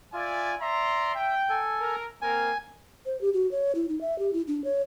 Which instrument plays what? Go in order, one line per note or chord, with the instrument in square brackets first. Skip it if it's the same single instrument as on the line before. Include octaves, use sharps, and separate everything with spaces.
[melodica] F4 [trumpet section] D5 E5 G#5
[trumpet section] D5 A#5 C6 [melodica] E5
[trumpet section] G5
[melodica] A4 G#5
[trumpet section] A#4
[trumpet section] A#3 C4 A#4 [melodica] G#5
[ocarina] C5
G4
F#4
C#5
E4
D#4
E5
G4
E4
D4
C#5